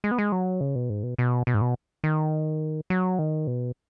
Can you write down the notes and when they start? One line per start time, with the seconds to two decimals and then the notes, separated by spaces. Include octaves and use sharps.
0.04 G#3
0.11 B3
0.18 G#3
0.32 F#3
0.61 C#3
0.75 B2
0.90 G#2
1.03 B2
1.18 B2
1.47 B2
1.54 G#2
1.62 B2
2.04 D#3
2.90 F#3
3.19 D#3
3.47 B2